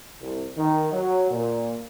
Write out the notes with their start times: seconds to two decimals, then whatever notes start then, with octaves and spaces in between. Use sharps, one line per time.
0.21 C2
0.57 D#3
0.92 F#3
1.31 A#2